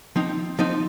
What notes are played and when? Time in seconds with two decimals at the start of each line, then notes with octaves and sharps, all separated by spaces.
0.16 F3 C4 D#4
0.59 F3 C4 D#4